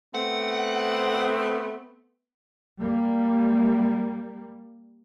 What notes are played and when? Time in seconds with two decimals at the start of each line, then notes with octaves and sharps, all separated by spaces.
0.14 A3 B3 C4 F#5
2.80 G3 A#3